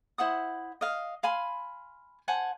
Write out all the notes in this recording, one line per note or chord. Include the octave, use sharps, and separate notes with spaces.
E4 C5 F#5 D#6
D#5 F5
F5 G#5 B5 C6
C5 F#5 G#5 A5